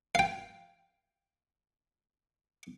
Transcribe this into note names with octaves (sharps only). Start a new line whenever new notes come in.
F5 G5